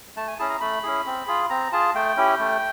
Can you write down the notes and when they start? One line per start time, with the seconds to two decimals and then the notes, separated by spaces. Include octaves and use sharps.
0.17 A3 A5
0.28 G#5
0.39 C#4 E4 G#4 A5
0.50 A#5
0.61 A3 B5
0.83 C#4 E4 G#4
1.06 C4
1.27 F4 G#4
1.50 C4 A#5
1.72 F4 G#4 A5
1.95 A3 G5
2.17 C#4 E4 G4
2.39 A3